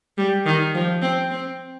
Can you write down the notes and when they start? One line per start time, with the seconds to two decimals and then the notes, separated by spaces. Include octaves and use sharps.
0.18 G3
0.46 D#3
0.75 F3
1.02 C4
1.31 C4